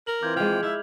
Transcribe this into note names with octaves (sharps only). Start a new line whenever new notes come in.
A#4 F#7
E3 C4 F4 D6 G6 G#6
F3 G#3 G5 F6 F7
E4 E5